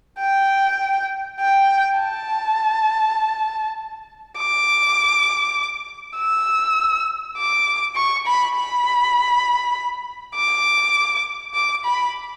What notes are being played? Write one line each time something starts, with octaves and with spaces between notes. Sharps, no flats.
G5
G5
A5
D6
E6
D6
C#6
B5
B5
D6
D6
B5